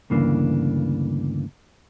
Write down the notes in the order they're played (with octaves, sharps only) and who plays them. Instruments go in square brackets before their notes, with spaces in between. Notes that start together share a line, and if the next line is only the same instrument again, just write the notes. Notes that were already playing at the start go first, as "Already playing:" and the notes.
[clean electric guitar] D2 G2 C#3 E3 A#3 D4